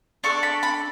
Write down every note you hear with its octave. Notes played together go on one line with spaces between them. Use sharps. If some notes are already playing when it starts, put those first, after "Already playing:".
D4 A4 C#6
B5
B5